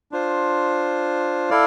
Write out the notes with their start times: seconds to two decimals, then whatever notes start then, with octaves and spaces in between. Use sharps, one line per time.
0.11 D4 F4 C5
1.50 E4 A4 D5 F5